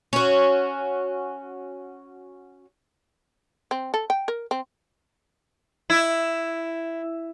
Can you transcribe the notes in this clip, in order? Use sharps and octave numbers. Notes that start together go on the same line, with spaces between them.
C#4 F#4
C4
A4
G5
A#4
C4
E4